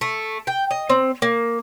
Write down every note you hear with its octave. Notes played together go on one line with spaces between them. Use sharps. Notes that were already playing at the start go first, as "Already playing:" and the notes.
A3
G5
D#5
C4
A#3